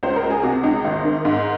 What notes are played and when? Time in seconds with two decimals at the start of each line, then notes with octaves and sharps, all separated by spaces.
0.03 C#2 C5
0.16 A#4
0.23 C#2
0.30 G#4
0.43 C3 F#4
0.64 C#2 D#4
0.85 G#1
1.04 D#3
1.25 G#2